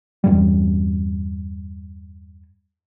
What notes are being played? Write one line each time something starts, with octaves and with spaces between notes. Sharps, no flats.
E2 G2 G3